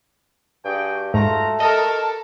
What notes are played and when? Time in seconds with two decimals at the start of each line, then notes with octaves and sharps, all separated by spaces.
0.65 G2 F#4 G#4 G5
1.14 G#2 A3 F4 F#4 A#5
1.60 A4 A#4 D#5